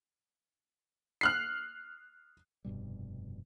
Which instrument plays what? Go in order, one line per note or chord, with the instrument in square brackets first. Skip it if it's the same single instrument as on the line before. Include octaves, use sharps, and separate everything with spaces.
[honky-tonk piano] F6 F#6 C7
[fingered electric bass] F1 G2 B2 G3